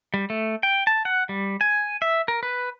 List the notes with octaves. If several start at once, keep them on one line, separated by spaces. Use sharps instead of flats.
G3
A3
G5
A5
F#5
G3
G#5
E5
A#4
B4